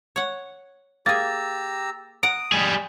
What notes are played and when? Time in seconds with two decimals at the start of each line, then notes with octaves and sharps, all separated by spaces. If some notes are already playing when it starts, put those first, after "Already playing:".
0.16 C#5 F#5
1.06 A#3 G4 G#4 A#5 E6 A6
2.23 F#5 A#5 D#6 D7
2.52 G3 G#4